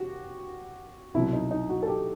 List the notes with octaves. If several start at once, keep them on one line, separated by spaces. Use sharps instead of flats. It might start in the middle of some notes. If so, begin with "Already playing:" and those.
Already playing: F#4 G4
C2 B2 F#3 E4
D#4
D#4
F#4
A4
G4